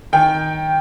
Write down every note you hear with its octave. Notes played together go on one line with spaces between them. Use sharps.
D#3 G5